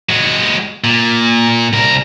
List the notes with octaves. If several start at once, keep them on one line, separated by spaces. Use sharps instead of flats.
G#3 F#4
A#2
C2 A#4